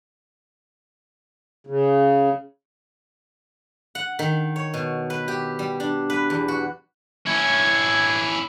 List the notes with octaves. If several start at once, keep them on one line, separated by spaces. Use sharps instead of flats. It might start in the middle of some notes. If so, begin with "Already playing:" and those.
C#3
F#5
D#3
C#5
B2
B4
G4
G3
D4
B4
E2
F#4
C#4 E4 G#6